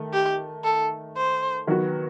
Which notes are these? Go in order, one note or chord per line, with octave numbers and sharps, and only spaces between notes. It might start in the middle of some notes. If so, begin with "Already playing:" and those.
Already playing: D#3 A3
G4
A4
C5
D#3 F#3 B3 F#4 B4